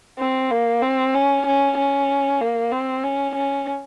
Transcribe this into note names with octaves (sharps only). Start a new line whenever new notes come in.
C4
A#3
C4
C#4
C#4
C#4
A#3
C4
C#4
C#4